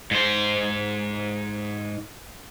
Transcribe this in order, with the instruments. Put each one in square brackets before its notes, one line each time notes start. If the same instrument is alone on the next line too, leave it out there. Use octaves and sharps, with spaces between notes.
[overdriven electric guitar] G#2 C5